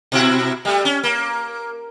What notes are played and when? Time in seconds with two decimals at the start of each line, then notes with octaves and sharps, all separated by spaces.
0.12 B2 E4 F#4
0.65 G3 A3
0.85 C#4
1.03 A#3